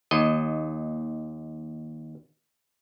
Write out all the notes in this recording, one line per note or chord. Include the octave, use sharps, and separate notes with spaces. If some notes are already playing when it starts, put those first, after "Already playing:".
D#2 D#5